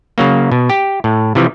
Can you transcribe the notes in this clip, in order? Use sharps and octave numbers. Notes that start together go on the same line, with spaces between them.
C#3 F#3 A#3
B2
G4
A2
C3 E3 F3